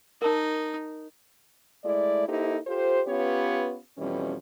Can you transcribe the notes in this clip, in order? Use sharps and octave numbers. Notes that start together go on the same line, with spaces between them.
D#4 A#4 A5
G#3 A3 E4 D5
A#3 D#4 E4 G4 A4 C5
F4 G4 A4 C5
B3 C#4 F4 G4 B4 C#5
F2 B2 E3 G3 C#4